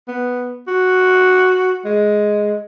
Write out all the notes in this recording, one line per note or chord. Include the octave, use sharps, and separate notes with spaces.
B3
F#4
G#3